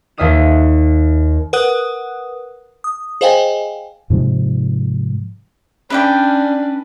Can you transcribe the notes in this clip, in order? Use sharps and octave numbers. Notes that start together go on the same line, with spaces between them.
D#2 D#4 E5 F5 D#6 E7
A#4 B4 F#5 D#6 F#6
D#6
G#4 C5 D#5 F5 G5 G#5
G#2 C3 F3 G#3
C#4 D4 B4 D5 G5